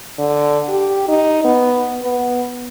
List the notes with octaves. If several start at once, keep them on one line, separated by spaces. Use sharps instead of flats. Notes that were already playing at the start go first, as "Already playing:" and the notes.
D3
G4
D#4
B3
B3